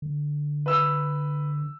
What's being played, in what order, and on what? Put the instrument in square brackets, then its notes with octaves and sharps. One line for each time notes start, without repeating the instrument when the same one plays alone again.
[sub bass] D3
[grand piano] B4 E6